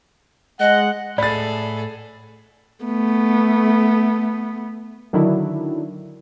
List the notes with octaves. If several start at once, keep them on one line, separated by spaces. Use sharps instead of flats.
G#3 D#5 F#5
A2 G#4 A4 D5 B5 A6
A3 B3
D3 D#3 F#3 D4 E4